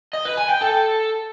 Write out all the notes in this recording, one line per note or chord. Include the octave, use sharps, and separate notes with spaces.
D#5
B4
G#5
G5
A4